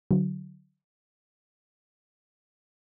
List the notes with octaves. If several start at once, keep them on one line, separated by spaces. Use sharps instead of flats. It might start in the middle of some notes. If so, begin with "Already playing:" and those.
D3 F#3